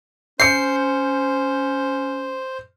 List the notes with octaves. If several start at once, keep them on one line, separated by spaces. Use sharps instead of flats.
C#4 C5 G6 C7 C#7